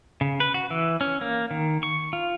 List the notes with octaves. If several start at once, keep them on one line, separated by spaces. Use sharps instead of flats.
C#3
B4
F#4
E3
C#4
A#3
D#3
C#6
F4